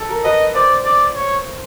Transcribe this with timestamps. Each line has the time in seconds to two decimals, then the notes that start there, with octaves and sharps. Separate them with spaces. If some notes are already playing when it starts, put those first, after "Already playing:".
Already playing: A4
0.09 A#4
0.24 B4 D#5
0.54 C5 D5
0.84 D5
1.15 C#5